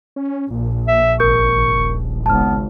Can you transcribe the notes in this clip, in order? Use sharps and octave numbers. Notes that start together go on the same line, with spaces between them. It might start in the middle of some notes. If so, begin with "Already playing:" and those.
C#4
A#1 A#2
E5
G#1 A#4 C#6 G6
D#1
G#1 C#2 B3 A5 F6